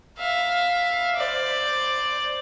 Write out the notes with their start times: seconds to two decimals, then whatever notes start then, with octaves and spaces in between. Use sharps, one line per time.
0.19 E5 F5
1.16 C5 D5